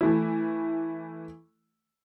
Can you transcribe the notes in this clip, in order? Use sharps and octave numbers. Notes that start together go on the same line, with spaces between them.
E3 A3 E4